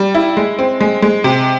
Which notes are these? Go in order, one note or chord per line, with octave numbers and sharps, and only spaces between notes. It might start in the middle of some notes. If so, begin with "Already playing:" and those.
Already playing: G3
E4
G#3
C4
G#3
G#3
C3